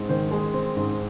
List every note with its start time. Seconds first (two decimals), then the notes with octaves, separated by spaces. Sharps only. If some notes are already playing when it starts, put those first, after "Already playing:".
Already playing: G#2 G#3 C4
0.09 D#3 C5
0.31 G#3
0.54 C4
0.77 G#2